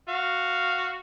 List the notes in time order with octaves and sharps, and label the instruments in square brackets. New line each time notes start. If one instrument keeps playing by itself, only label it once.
[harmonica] F#4 F5